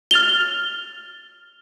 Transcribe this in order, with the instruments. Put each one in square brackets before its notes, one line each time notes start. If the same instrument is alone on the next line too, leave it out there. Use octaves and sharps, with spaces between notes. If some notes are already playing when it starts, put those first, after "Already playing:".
[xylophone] F6 A6 F7 G7